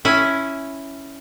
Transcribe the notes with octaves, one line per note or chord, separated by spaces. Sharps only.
C#4 E4